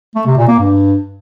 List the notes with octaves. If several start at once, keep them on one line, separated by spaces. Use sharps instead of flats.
A3
C3
A#2
A#3
G2